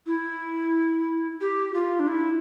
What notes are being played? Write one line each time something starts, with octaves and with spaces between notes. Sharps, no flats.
E4
G4
F4
D4
E4